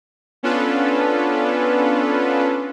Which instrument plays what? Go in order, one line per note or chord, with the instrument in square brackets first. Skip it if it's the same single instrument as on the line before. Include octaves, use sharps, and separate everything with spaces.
[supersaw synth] B3 C#4 D4 F4 A4 B4